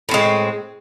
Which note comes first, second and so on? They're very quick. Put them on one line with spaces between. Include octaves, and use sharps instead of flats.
A2 C4 G#3